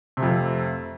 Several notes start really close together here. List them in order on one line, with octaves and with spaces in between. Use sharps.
C3 A3 F2